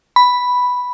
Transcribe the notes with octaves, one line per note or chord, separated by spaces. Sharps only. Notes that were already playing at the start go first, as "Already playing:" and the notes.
B5